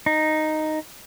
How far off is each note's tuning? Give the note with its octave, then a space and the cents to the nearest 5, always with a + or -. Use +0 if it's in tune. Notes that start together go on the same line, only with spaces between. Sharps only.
D#4 -5